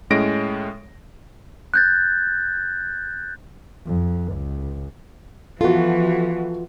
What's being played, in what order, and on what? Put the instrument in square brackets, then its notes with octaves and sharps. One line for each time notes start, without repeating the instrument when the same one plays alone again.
[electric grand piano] A2 G#3 C#4 A#6 D7
[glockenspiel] F#6 G6 A6
[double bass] F2
C#2
[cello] E3 F3 [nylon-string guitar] B3 F4 [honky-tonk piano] F#4 A4